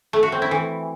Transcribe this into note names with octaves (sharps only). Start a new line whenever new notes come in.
A3
F#4
C4
E4
E3